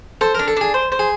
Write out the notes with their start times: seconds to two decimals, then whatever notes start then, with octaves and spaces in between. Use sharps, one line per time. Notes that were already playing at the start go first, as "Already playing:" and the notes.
0.21 A4 C5
0.35 A#4
0.39 D4
0.48 A4
0.57 D4 G#4
0.74 C5
0.92 C5
0.99 G#4